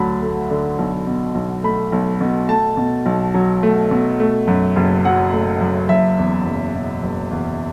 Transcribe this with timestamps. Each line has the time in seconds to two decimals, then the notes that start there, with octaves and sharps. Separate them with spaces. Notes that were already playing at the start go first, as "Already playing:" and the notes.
Already playing: D2 D3 F#3 A5 B5
0.22 A3
0.50 D3
0.79 B1
1.07 B2
1.35 B1
1.64 A3 B5
1.92 B1
2.21 B2
2.49 A3 A5
2.77 B2
3.06 B1
3.34 F#3
3.63 A3
3.91 B2
4.20 A3
4.47 F#2
4.76 F#1
5.05 F#3 F#5
5.33 A3
5.61 F#2
5.89 F#1 E5
6.19 E2
6.46 F#1
6.75 B2
7.03 F#1
7.31 E2